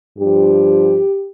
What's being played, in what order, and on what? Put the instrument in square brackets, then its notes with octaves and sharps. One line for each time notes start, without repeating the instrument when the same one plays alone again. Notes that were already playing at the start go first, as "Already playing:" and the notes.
[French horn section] G2 F3 G4